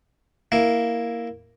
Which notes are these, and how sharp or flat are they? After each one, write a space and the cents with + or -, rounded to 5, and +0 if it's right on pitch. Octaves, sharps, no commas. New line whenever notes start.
A#3 +0 E4 +0